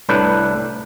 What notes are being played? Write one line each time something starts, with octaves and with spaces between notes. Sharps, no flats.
C2 A2 D4 B4